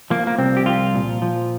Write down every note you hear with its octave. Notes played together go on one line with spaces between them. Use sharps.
F3 A#3
A#3
C2 C4
G4
F3 F4
A#2
F3